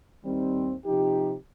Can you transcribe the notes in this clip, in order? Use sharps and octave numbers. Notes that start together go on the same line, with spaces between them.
D#2 D#3 G3 C4
C3 F3 D#4 G4